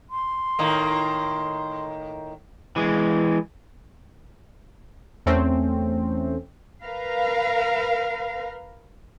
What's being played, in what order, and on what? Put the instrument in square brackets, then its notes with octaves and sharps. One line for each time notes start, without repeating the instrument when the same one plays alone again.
[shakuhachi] C6
[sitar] A2 D#3 A#3
[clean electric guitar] E3 G#3
[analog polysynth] E2 A3 C4 C#4
[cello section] A#4 B4 F5